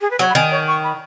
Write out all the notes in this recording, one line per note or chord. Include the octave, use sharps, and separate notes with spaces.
G#4
B4
F#3 C#5
B5
D#3 G#5
C#5
C#6
B5